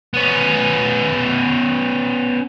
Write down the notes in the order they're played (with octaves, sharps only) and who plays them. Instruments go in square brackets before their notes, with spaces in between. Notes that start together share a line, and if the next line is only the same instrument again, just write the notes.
[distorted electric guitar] B3 C#4